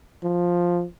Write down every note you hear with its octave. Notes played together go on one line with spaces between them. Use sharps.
F3